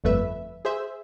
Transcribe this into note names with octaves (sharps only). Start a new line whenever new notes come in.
G1 F2 A3 B4 E5
G#4 C5 E5